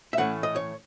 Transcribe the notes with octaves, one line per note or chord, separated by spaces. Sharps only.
E5
A2 E3 A3 C#4 F#5
D#5
C#5